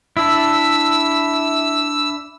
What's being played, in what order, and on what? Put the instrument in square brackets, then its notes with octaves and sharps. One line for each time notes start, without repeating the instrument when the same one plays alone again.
[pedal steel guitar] D4 E4 [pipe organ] E6